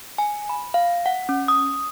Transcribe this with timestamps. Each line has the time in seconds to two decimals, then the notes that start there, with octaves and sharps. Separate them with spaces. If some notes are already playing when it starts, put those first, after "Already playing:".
0.18 G#5
0.49 B5
0.74 F5
1.06 F#5
1.29 C#4
1.48 D#6